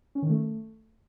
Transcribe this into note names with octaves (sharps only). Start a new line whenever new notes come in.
C#4
D#3
A3